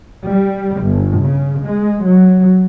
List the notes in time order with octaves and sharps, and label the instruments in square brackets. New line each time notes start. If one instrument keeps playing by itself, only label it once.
[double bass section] G3
G1
C#3
G#3
F#3